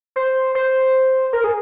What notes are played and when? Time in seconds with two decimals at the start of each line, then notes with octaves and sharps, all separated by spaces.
0.16 C5
0.55 C5
1.33 A#4
1.44 G#4